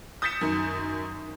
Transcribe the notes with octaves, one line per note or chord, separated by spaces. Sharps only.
D#6 G6 A6 B6 C#7 E7
F#2 D#3